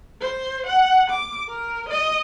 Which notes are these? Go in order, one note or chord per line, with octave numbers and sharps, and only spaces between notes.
C5
F#5
D6
A#4
D#5